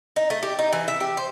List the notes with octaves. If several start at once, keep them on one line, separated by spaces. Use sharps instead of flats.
D#4
A3
G4
D#4
E3
E5
G4
C5